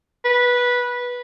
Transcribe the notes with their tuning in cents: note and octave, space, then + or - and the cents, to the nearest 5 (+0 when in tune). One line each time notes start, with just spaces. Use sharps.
B4 -10